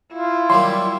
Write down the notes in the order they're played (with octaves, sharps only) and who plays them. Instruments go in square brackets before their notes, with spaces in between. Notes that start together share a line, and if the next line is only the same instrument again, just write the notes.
[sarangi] E4 [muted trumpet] F4
[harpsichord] F#3 G3 A#3 [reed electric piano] C6